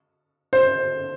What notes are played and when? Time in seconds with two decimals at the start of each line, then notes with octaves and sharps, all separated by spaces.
0.53 C5